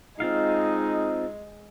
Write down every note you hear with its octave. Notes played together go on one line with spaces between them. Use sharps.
G#3 C4 D#4 F4 F5